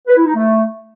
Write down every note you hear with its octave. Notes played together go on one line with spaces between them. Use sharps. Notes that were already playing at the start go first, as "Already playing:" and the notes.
B4
E4
D#4
A3